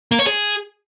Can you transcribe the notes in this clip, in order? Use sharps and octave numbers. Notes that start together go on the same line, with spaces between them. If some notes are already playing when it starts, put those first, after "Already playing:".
A#3
C#5
G#4